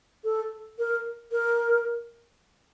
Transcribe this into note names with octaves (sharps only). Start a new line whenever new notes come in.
A4
A#4
A#4